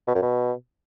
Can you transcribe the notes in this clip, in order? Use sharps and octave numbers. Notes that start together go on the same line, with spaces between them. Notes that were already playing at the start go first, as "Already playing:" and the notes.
B2
F#2
B2